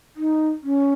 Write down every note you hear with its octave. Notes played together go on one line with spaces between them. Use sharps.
D#4
C#4